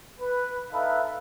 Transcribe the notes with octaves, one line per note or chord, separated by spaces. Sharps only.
B4
D#4 A4 B4 E5 F5 B5